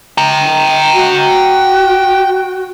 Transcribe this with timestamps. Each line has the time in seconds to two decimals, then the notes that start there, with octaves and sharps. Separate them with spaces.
0.18 G5 A#5
0.93 F#4